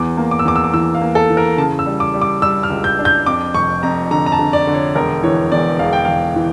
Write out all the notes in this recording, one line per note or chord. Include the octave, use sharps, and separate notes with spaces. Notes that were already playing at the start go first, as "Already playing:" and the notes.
Already playing: E2 D6
A#3
D6
E6
E2 D6
E6
D6
E3 E6
F5
A#3
A4
E3
A#4
C#3 A5
E6
G3
D6
G3
D6
G3 E6
F6
C#2
G6
D4
G6
F2 D6
F1 C#6
F2 A#5
D3 A#5
A#5
A5
D3
D5
D3
C#5
E1 A#4
E3 C#5
E2 D5
E1 F5
G5
E1 F5
E3